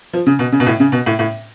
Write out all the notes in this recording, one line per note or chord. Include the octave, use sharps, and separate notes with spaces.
F3
C#3
B2
C#3
B2
A2
C#3
B2
A2
A2